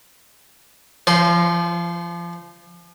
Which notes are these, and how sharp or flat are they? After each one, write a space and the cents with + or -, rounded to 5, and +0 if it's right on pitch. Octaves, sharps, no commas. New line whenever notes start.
F3 -30 C5 +0